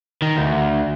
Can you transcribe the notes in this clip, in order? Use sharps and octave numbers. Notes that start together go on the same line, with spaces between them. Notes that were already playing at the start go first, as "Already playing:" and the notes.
D#3
D2